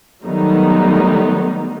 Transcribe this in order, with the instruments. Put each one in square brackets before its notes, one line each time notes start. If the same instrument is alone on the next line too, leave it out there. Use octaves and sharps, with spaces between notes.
[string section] D#3 F#3 G3 A3 B3 D#4